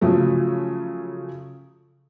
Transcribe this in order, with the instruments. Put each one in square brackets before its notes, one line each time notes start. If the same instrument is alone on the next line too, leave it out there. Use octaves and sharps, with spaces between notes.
[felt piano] C#3 F3 F#3 A3